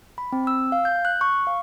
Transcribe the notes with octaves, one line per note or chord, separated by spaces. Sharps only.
B5
C4
E6
F5
G6
F#6
C#6
F5